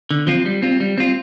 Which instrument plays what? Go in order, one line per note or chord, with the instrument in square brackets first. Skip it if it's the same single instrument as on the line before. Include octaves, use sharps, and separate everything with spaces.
[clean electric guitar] D3
F3 C4 F4
G3
C4 F4
G3
C4 F4